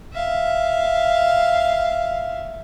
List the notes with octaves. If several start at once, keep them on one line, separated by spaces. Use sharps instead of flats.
E5 F5